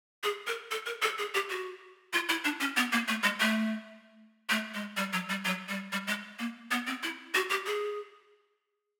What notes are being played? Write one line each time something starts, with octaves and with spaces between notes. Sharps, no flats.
G#4
A#4
A4
A#4
A4
G#4
G4
F#4
F4
E4
D4
C#4
B3
A#3
A3
G#3
A3
A3
G#3
G3
F#3
G3
F#3
G3
G3
G#3
A#3
B3
C4
E4
F#4
G4
G#4